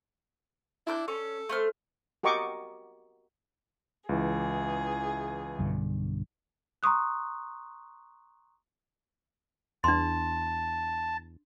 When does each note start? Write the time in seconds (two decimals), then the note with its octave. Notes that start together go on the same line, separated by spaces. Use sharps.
0.87 D4 E4 D6 G6
1.08 C#4 A4
1.49 A3 C5 F6
2.23 F#4 G4 A#4 D#5 C#6 D6
4.09 C#2 E3 G#4
5.59 B1 G2 D3
6.83 A#5 C6 C#6 D#6 F#6
9.84 E2 D4 A5 C6